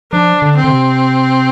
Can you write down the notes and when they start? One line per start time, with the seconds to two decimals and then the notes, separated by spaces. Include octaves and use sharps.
0.12 F3 D4
0.42 D3
0.56 C4
0.64 D3
0.70 C3